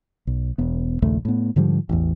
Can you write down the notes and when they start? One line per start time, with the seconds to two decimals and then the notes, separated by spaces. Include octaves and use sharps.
0.27 B1
0.58 E1 B3
1.02 A#1 D#2 C#3 A3
1.25 A2 B3
1.56 G#2 D3 F3 G3
1.89 A1 E2